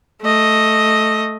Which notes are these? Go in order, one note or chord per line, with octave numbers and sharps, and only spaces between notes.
A3 D#5